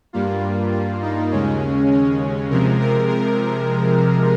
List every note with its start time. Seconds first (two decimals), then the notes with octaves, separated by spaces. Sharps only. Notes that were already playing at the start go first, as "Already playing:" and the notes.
0.13 G2 G3 A#3 F4
0.72 F4
1.02 D#4
1.31 D#2 C#3 G#3 C#4
1.91 C#4
2.50 C3 F3 G#3 A#4
2.81 A#4
3.10 A#4